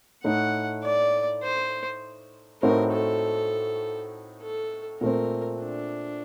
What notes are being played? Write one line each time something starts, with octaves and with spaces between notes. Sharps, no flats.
A2 A3 D#4 F#5
D5
C5
A2 A3 C4 D#4 F#4 A#4
A4
A4
A#2 A3 C4 A#4
D4